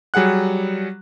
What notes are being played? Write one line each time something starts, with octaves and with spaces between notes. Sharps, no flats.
F#3 G3 G#4 F#5 F#6